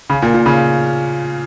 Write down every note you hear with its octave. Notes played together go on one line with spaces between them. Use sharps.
C#3
A#2
A#2
C#3